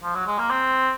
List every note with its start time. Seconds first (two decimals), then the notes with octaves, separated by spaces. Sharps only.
0.03 F3
0.15 F#3
0.26 G#3
0.39 A#3
0.50 C4